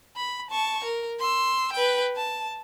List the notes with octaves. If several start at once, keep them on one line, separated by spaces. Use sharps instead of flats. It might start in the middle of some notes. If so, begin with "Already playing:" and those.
B5
A5 C#6
A#4
C6 E6
B4 G5
A5